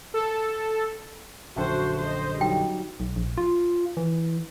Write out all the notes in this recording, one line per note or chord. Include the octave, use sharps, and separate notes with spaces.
A4
A#1 F#2 D3 F#4 C5 E5 G5 A5
C5 D#5
F#3 G3 D#4 F#4 G5
B1
A#1
F4
E3